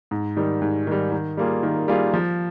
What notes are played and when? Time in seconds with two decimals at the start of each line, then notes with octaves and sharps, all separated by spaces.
0.11 G#2
0.37 D#3 G3
0.62 G#2
0.87 D#3 G3
1.12 D#3
1.37 G3 A#3 F4 G#4
1.63 D#3
1.88 G3 A#3 F4 G#4
2.14 F3